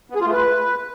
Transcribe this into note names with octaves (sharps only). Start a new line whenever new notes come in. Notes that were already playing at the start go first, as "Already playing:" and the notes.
B3
G#4
F4
A3
B4